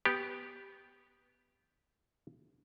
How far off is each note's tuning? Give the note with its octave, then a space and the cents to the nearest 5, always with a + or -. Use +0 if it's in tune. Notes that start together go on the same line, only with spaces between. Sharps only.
B3 +0 G4 +0